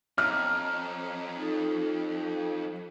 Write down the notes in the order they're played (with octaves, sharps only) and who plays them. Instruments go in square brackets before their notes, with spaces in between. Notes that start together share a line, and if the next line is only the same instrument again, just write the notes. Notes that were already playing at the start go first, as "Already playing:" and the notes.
[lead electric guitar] F2 [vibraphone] C#5 D#5 A#5 [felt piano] F6
[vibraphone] D#4 F4 A4